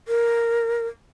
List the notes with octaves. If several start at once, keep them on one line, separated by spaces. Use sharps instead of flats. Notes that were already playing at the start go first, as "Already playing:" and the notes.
A#4